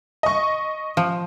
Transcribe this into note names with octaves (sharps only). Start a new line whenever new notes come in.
D#5 C#6
F3